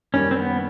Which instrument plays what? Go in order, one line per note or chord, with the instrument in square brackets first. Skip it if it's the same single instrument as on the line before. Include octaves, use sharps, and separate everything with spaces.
[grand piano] F#2 D#3 G3 A#3 [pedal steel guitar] C#4
[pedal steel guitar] C4
B3